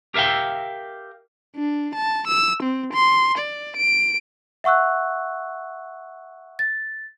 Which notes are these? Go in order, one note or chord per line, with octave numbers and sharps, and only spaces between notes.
G4 A#4 E5 F5 G5
D4
A5
E6
C4
C6
D5
D7
E5 F#5 C#6 E6 F#6
A6